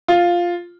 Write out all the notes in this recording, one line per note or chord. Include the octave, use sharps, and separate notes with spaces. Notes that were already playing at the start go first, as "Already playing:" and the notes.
F4